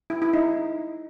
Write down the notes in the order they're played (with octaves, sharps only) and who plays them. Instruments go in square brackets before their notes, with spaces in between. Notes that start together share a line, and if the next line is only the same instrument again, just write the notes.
[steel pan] E4
E4
D#4